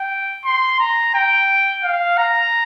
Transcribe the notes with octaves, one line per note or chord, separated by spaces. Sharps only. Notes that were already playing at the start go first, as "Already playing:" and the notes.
Already playing: G5
C6
A#5
G5
F5
A#5